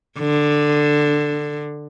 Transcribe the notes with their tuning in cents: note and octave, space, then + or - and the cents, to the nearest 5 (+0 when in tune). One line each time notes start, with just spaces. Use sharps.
D3 +10